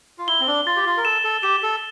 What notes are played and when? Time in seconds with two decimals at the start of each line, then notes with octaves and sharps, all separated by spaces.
0.18 F4
0.27 E4 G7
0.40 C4
0.47 D4
0.66 F4 A6
0.76 G4
0.86 F4
0.97 A#4
1.05 A4 E7
1.24 A4
1.43 G4 E7
1.62 A4